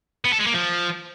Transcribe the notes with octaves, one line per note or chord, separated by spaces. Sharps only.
B3
A4
G#3
A#3
F3